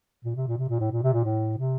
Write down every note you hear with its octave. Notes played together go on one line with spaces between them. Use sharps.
A#2
C3
A#2
C3
A#2
A2
A#2
C3
A#2
A2
C3